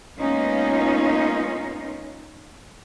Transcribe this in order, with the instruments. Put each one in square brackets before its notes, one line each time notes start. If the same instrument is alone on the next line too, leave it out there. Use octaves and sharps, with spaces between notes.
[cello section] G#3 A#3 B3 C#4 D#4 F4